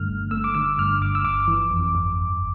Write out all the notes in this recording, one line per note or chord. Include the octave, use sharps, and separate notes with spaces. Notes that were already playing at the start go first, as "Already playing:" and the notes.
Already playing: G2 D3 A3 F6
G1
A3 E6
D6
D3 E6
G2 F6
G1 D6
E6
G1 D6
E3
F2
G1
G1